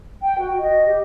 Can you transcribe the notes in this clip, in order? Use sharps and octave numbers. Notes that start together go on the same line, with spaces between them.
G5
F#4
D#5
G4